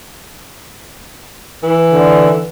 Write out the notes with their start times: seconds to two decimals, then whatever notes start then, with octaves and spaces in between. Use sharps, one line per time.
1.63 E3
1.91 D3